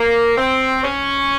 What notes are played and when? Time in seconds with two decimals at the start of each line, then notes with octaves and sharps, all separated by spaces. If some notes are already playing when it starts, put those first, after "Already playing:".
Already playing: A#3
0.37 C4
0.83 C#4